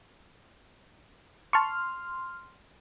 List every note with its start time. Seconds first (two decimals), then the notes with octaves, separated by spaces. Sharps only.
1.53 A5 C6 C#6 F6